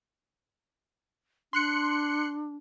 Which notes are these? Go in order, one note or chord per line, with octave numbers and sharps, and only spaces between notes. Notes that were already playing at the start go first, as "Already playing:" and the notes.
D4 C6 F#6 C#7